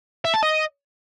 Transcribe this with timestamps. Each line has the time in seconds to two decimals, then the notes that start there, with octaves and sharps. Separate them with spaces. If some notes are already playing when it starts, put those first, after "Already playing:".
0.25 E5
0.34 A5
0.43 D#5